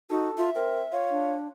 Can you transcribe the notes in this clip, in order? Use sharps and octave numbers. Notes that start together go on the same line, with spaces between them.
D#4 F#4 A4
F4 E5
C4 A#4
F4 C#5
D4